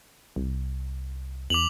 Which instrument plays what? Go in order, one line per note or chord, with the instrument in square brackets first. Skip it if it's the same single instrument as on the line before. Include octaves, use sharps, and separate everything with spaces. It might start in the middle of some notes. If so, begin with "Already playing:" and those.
[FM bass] C2
[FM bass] E2 [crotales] D6 F7 F#7